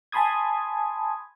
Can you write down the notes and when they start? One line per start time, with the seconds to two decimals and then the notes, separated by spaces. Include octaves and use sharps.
0.12 G#5 A5 B5 C6 D#6 G#6